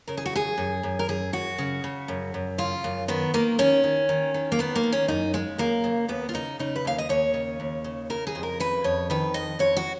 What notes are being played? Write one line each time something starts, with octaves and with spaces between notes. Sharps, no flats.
C#3 A#4
G#4
F#4
F#2 G#4
F#2
F#2
A#4
F#2 G#4
F#2 F#4
C#3
C#3
F#2
F#2
C#3 F4
F#2
D#3 B3
D#3 A#3
D#3 C#4
D#3
D#3
D#3
A#3
D#3 B3
A#3
D#3
C#4
F#2 D#4
C#3 G#3
F#2 A#3
C#3
D#2 B3
F4
C#3 D#4
C#3 D#4
B4
D#2 F5
D#5
D#2 C#5
C#3
D#2
C#3
C#3 A#4
G#4
F2
A#4
C#3 B4
F2 C#5
D#3 B4
F2 D#5
F2 C#5
F#4